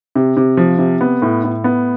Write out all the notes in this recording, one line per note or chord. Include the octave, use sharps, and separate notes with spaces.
C3
C3
F3
C3
B3
A2
A2
B3